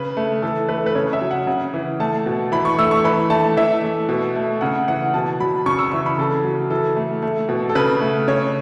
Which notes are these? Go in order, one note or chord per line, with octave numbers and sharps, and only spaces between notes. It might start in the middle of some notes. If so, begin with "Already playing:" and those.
Already playing: C#3 B4
A3
E3 A4
A3 B4
A4
B4
C#3 C#5
E5
F#3
F#5
C#3
E3
A3 A5
B2
E3 B5
C#6
A3 E6
C#6
E3 B5
A3 A5
E3 E5
A3
B2
A3
C#3 F#5
E3 F#5
B2 A5
F#3 B5
C#3 C#6
E6
E3 C#6
B5
C#3 A4
F#3
E3 A4
A3
A3
B2
A4
C#3 B4
A3
C#3 C#5